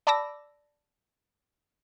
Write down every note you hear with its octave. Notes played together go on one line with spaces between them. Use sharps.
D5 A5 B5 D6 E6 A#6